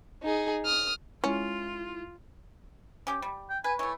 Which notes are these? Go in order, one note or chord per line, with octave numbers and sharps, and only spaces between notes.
D#4 G#4
D#6 F6
G#3 C#4 E4 F4
C#4 G4 G5
G3
G5
B4 G#5
E3 A3 C#5